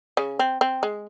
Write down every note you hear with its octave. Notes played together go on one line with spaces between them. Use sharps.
C#3 C#4
C4
C4
G#3